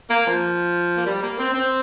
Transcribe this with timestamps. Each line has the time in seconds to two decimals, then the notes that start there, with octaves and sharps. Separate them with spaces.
0.10 A#3
0.26 F3
0.97 A#3
1.06 G3
1.23 A#3
1.39 C4
1.54 C4